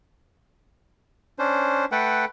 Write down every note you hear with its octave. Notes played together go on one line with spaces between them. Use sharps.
C#4 D4 C5
A3 A4 B4 F#5 G5